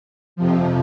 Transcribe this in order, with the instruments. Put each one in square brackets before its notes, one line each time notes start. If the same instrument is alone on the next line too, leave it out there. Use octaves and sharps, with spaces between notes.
[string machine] F2 C3 F3